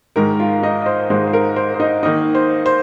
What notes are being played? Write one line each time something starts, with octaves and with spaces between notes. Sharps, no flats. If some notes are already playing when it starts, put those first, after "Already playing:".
G#2 D#3 G#3 A#4 A#5
F4 F5
D#4 D#5
D#5
C5
G#2 D#3 G#3 C5
C5
A#4
C5
C5
D#4 D#5
D#3 A#3 D#4 D#5
C5
C5